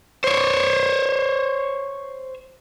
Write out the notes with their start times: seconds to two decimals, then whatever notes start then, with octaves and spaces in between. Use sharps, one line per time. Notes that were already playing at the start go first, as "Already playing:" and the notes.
0.24 C5 C#5